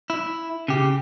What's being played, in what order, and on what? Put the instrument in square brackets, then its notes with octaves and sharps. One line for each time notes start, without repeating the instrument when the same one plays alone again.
[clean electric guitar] E4
C#3 G4